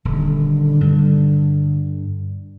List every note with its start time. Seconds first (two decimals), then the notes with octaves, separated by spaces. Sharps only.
0.05 D#1 D3
0.81 G2 G3